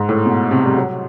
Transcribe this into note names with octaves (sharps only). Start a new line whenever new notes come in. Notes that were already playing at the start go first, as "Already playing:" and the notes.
Already playing: G#2
A2
B2
C3
G3
F#3